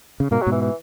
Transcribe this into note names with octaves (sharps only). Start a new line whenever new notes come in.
C#3
G#2 B2 A#3
F#3
G#2 B2 E3
E3